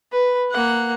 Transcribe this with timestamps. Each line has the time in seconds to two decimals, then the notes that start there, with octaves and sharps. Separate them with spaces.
0.12 B4
0.52 A#3 F#5